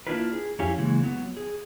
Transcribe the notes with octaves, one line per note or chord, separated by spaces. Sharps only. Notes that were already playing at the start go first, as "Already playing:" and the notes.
A#3 D4 E4 F4 A#4 B4
G#4
F2 C#4 E4 G4 F5 G#5
C#3 E3 G#3 A#3
F#3 B3
G#4